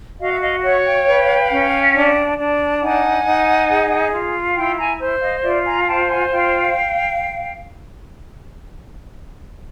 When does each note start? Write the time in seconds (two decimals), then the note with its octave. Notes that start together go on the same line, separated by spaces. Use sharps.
0.20 F#4 D#5 F5
0.33 E5
0.41 D#5 F5
0.63 C#5 E5 F#5
0.85 F5 G5
1.07 B4
1.51 C#4
1.95 D4
2.39 D4
2.81 D#4 F#5 G#5
3.26 D#4
3.69 G#4
4.12 F4
4.56 E4 F5 G5
4.78 G#5 A#5
5.00 C5
5.21 D#5 F5
5.43 F4 D5 E5
5.65 G#5 A#5
5.81 G#5
5.87 C5 G5 A5
6.09 F#5 G#5
6.30 F4 F5 G5